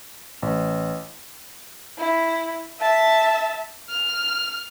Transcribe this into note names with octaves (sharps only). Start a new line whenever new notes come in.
A1
E4
E5 A5
F6